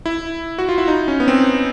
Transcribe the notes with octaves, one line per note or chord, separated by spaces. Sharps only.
E4
F#4
F4
E4
D#4
C#4
B3
C4